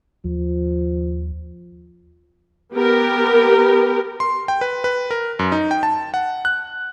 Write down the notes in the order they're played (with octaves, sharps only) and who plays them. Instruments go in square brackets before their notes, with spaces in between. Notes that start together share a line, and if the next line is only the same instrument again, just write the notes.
[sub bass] D#2 [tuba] F3
[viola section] B3 G4 A#4
[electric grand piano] C6
G5
B4
B4
A#4
F#2
D#4
G5
A5
F#5
F#6